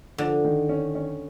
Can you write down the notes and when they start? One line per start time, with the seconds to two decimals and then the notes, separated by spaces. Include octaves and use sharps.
0.18 D3 F3
0.44 D#3
0.69 C#4
0.95 C#4